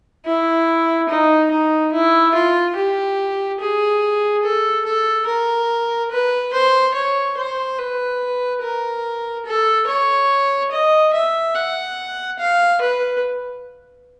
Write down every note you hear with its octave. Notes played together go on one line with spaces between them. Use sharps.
E4
D#4
D#4
E4
F4
G4
G#4
A4
A4
A#4
B4
C5
C#5
C5
B4
A#4
A4
C#5
D#5
E5
F#5
F5
B4